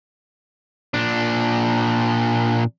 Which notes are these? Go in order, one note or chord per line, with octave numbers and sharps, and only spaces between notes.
A#2 D4